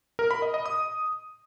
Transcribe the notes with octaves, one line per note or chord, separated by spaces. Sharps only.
A#4
B5
D#5
D#5
D#6